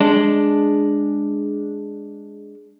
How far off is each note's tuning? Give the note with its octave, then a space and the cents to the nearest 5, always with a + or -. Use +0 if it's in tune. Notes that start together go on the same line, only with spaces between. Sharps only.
G#3 +0 D4 +0